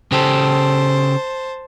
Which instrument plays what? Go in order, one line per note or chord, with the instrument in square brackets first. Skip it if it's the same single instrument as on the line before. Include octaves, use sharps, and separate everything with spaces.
[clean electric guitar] C#3 G4 A4 [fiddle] C5 A5